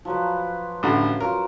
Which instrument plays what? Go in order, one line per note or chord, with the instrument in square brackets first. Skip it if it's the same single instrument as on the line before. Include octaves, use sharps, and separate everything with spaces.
[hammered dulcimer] F3 F#3 B4
[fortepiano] A1 D3 F#5
[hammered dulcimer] F#3 F4 [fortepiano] A#4